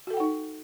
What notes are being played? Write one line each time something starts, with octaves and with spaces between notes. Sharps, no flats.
D#4 F#4 A4 F#5 G5